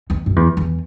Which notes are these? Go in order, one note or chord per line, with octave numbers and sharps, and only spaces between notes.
E2
F#2
E2
E2